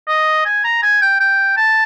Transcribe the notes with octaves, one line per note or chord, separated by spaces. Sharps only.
D#5
G#5
A#5
G#5
G5
G5
A5